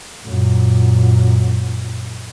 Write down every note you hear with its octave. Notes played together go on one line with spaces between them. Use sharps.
F#2 A#2